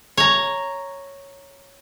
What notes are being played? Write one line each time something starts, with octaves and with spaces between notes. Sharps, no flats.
C#5 A#5